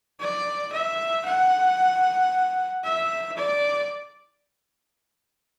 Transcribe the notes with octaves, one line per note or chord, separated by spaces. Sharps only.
D5
E5
F#5
E5
D5